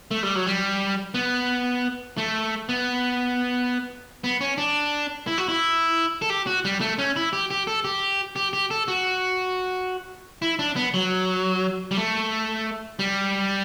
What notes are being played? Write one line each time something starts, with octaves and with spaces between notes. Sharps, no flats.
A3
G3
F#3
G3
B3
A3
B3
B3
C#4
D4
E4
F#4
E4
A4
G4
F#4
G3
A3
C#4
E4
G4
G4
A4
G4
G4
G4
A4
F#4
E4
D4
B3
F#3
G3
A3
G3